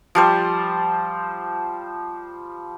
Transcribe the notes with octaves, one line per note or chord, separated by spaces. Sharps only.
F3 G3 C5